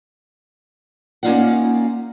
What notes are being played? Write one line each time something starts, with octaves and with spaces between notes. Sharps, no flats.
A#3 C#4 D#4 F4 D5 F#5